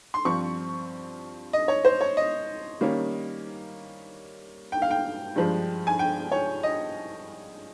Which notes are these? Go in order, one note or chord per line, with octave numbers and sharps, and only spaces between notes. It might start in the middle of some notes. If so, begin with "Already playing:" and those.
C6
G2 F3 C4 C#6
D#5
C#5
C5
C#5
D#5
D#3 G3 A#3 C#4
G5
F5
G5
G2 F3 G#3
G#5
G5
C#5
D#5